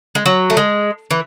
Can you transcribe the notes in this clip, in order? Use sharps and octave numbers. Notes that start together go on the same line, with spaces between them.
G#3
F#3
A3
G#3
E3